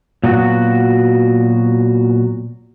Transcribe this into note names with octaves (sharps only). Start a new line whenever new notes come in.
A#2 F#3 B3 F#4